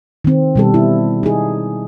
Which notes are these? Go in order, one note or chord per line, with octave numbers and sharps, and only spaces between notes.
D#3 C4
B2 G3 A4
E4
D#4 G#4